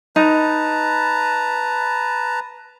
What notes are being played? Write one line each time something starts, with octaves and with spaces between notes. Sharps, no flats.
D#4 B4 A5 A#5